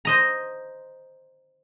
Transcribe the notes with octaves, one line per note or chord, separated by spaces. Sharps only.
C5 D#5 A#5